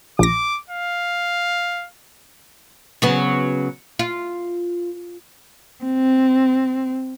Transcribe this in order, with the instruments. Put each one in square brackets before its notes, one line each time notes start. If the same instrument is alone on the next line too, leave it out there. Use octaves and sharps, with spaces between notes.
[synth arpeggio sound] A#1 A#6 [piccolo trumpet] D6
[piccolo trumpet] F5
[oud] C#3 F#3 B3
F4
[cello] C4